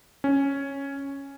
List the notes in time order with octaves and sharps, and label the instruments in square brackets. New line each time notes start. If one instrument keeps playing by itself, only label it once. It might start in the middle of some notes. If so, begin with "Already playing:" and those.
[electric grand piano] C#4